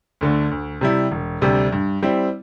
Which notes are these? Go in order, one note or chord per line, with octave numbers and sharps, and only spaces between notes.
D2 D3 A3
D2
C3 G3 E4
E1
D2 C3 G3
G2
G3 C4 E4